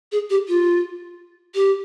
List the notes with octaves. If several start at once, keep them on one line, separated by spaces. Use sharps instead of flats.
G#4
G4
F4
G4